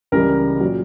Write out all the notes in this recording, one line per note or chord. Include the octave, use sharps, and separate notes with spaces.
C#2 C#3 E3 G3 A#4
A#2 F#3